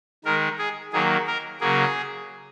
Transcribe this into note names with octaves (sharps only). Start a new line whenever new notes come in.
D#3 G#3 A#4
G#4
D#3 F#3 A#3 G#4
A#4
C#3 F#3 A#3 G#4